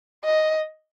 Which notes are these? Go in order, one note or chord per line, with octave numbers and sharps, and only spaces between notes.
D#5